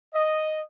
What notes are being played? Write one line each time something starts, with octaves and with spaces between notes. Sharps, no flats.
D#5